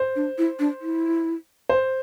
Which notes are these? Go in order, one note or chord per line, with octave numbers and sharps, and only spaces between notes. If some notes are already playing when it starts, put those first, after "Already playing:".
Already playing: C5
D4
E4
D4
E4
C5